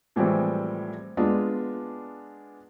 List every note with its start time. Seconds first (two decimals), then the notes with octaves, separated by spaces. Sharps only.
0.16 A2 E3 F3 G3 G#3 C4
1.17 G#3 B3 D4 F4